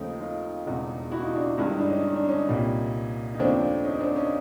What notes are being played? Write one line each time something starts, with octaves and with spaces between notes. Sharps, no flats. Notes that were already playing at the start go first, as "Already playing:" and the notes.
Already playing: D#2 C#3 F3 A3 D#4 F4
D#4 F4
E1 E2 C#3
E4 F#4
D#4 F4
D4 E4
G1 G2 D#3 G#3 E4
D#4
D4
C#4 D#4
D#4
D4
C#4 D#4
C2 A#2 G3
D#4
D#2 C#3 F3 A3 C4 D4
C#4 D#4
C4 D4
C#4 D#4